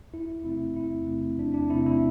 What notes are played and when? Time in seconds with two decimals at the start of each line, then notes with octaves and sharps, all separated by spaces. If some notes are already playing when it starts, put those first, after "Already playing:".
0.13 E2 E4
0.44 C3 A3 C4 E4
0.76 E2 E4
1.07 C3 A3 C4
1.38 E2 D4
1.54 D4
1.70 C3 A3 C4 E4
1.86 E4